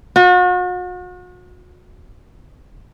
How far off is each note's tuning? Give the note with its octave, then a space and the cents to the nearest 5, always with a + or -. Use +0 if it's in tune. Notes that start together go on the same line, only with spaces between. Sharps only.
F#4 -40